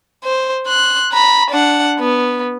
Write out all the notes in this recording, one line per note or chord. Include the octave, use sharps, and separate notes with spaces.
C5
C6 F#6
A#5 B5
D4 F#5
B3